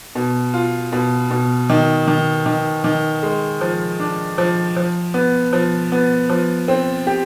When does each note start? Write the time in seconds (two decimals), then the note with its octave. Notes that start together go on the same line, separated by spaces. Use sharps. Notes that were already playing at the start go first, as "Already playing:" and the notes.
0.15 B2
0.54 F4
0.92 B2
1.31 B2
1.70 D#3
2.08 D#3
2.46 D#3
2.84 D#3
3.23 G#3
3.61 F3
4.00 D4
4.38 F3
4.76 F3
5.14 B3
5.53 F3
5.92 B3
6.30 F3
6.68 C4
7.07 G4